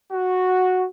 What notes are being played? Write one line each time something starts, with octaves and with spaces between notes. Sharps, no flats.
F#4